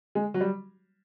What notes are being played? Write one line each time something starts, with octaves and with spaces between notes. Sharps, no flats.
G#3
F#3
G3